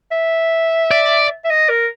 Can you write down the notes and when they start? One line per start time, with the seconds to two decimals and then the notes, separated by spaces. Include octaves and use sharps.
0.12 E5
0.91 D5
1.44 E5
1.50 D#5
1.69 A#4